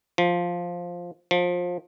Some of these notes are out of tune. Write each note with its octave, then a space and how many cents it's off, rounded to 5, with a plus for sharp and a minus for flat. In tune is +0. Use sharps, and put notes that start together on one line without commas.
F3 +5
F3 +25